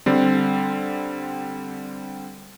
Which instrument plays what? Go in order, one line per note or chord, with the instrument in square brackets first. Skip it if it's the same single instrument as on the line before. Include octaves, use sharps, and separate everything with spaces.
[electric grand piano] D3 G3 C4